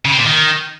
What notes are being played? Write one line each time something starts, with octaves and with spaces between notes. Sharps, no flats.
C#3
C4
A#2
D#3